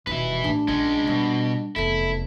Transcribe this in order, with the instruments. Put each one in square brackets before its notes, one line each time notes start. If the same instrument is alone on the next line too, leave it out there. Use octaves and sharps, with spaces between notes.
[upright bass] D#1 E3 [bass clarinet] B2 [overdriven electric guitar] B4 E5
[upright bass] A1 [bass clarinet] D4
[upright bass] A#1 [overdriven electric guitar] G#3 C#4
[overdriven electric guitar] B2 [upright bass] G3
[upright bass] F1 E2 [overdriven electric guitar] E4 [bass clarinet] A4